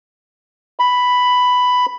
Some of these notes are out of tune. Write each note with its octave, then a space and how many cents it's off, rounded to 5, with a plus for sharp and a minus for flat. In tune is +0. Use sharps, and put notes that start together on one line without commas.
B5 +5